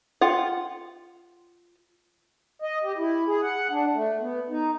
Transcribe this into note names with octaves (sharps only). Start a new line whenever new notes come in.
F4 F#5
D#5
G4
E4
G#4
F#5
D4
A3
B3
D#4